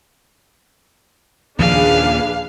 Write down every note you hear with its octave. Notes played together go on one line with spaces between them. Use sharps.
D#2 A#2 C#3 F3 D4 G#4 B4 F5